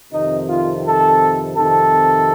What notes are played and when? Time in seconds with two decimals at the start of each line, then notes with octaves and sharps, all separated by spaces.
0.11 F2 C3 D#3 D#4
0.47 F4
0.84 A4
1.55 F2 C3 D#3 A4